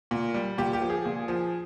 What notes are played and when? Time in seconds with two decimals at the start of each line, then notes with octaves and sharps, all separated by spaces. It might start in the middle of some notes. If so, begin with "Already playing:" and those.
0.11 A#2
0.34 G3
0.58 A#2 G4
0.73 G4
0.82 F3
0.90 G#4
1.05 A#2
1.28 F3